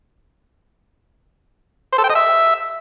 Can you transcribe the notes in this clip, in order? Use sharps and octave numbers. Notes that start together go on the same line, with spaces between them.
C5
A4
G5
D#5
E5